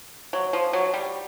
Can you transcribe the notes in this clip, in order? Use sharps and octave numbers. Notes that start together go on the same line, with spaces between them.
F#3
F3
F#3
G3